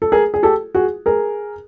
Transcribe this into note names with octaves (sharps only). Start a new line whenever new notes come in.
A4
G#4 A#4
G#4
G4 A4
F#4 G#4
G#4 A#4